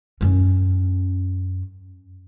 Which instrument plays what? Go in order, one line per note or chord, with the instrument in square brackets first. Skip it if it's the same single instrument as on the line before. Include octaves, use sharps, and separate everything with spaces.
[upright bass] F#2 C#4